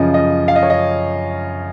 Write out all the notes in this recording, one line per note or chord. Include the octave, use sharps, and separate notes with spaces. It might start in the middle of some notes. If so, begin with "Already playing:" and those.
Already playing: F#2 C#3 F3 D#5
D#5
F5
D#5
C#5
D#5